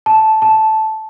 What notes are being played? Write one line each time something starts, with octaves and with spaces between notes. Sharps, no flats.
A5
A5